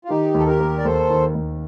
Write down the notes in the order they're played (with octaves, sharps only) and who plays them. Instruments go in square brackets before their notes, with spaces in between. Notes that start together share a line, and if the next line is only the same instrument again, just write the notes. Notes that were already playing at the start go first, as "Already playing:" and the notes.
[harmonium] F4
[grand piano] D#3 [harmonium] D#4 G4
[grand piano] D#2 [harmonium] A4
[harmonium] G4 A#4
[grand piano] A#3
[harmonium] D5
[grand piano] D#2 [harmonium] A4 C5
[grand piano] D#3
D#2